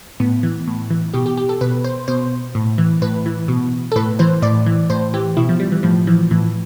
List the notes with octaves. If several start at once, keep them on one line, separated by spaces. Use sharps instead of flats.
A2 B3
E3
A2
E3
B2 G4
G4
G4
A4
B2 B4
C5
B2 C5
A2
E3
A2 B4
E3
B2
A4
A2 B4
E3 C5
A2 D5
E3
A2 C5
E3 G4
B2 E4
F3
G3
E3
A2 F3
E3 F3
A2 E3